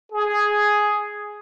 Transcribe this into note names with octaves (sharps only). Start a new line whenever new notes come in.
G#4